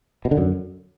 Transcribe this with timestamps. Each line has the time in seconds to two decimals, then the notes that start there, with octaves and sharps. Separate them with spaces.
0.25 B2
0.31 D3
0.38 F#2